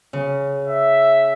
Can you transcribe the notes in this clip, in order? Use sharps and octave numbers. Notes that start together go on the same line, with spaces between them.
C#3
E5